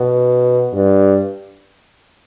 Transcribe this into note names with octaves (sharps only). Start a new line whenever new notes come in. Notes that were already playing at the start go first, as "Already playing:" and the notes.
Already playing: B2
G2